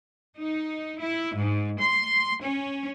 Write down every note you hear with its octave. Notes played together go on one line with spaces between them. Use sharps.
D#4
E4
G#2
C6
C#4